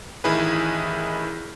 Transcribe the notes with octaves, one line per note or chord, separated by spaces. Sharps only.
A1 D#3 E4 G#4 B4